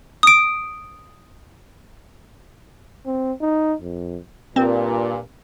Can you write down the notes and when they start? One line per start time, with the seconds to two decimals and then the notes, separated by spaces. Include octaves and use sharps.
0.23 D#6 D7
3.06 C4
3.41 D#4
3.82 F2
4.56 G2 A#2 C4